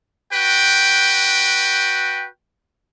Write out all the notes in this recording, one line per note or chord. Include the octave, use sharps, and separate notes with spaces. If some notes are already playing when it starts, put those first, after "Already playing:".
F#4 B4 G5